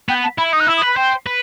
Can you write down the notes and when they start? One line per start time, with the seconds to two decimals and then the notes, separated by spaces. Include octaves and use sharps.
0.09 B3 G5
0.23 A5
0.38 E4 B5
0.52 D#4 D#6
0.60 F#6
0.67 E4 E6
0.77 D#6
0.82 B4
0.87 B5
0.97 C5 G5
1.27 B4